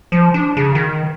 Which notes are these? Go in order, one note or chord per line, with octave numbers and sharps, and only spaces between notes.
F3
D4
C#3
D#3